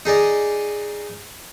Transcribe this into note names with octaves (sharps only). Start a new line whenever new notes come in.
D#4 G#4 D5 D#5